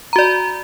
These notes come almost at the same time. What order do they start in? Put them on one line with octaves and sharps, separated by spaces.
A#5 F#4 D5